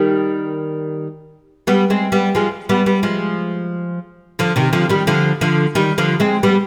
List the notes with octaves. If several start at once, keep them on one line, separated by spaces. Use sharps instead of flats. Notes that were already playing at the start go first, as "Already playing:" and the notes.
Already playing: D#3 G3
G3 B3
G#3 C4
G3 B3
F3 G#3
G3 B3
G3 B3
F3 G#3
D3 F3
C3 D#3
D3 F3
D#3 G3
D3 F3
D3 F3
D#3 G3
D3 F3
G#3 C4
G3 B3